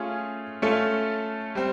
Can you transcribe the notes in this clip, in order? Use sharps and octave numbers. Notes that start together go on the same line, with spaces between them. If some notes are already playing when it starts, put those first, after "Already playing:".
Already playing: A3 C#4 F4 G#4
A3 C#4 F4 A4
G3 C4